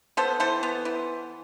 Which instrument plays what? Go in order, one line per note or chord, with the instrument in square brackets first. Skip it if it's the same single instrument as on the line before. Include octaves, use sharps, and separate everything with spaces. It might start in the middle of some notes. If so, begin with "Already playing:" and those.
[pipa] B3 A4 C5
E3 A4 C5
B3
E3